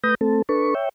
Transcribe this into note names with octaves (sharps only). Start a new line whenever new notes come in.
A3 B4 D#6 G6 A#6
A3 C4 A4
D4 A4 B4 C#6
C#5 E5 G5